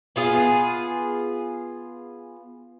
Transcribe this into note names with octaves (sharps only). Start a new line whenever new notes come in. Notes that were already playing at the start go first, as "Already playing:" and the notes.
B3 F4 G#4